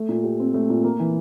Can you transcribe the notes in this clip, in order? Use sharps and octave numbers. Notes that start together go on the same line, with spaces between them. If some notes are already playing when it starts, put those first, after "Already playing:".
Already playing: A3
A#2
G4
C4
A3
A#2
A#3
E3